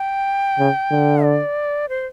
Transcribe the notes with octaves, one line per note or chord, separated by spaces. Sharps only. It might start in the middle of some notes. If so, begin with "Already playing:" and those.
Already playing: G5
C#3
D3
D5
C5